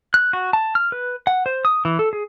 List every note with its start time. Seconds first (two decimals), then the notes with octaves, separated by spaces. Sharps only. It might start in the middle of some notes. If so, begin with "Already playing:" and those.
0.14 F#6
0.33 F#4
0.53 A5
0.75 F6
0.92 B4
1.27 F#5
1.46 C5
1.65 D#6
1.85 E3
1.99 A4
2.13 G#4